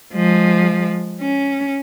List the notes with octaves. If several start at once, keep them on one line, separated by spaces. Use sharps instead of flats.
F3 G#3
C#4